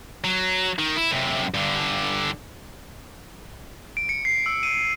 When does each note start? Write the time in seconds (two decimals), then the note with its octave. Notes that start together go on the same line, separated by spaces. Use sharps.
0.24 F#3
0.78 D#3
0.96 E4
1.11 F#2 C3
1.54 G2 D3
3.97 D7
4.09 C#7
4.25 C7
4.46 E6
4.63 D#7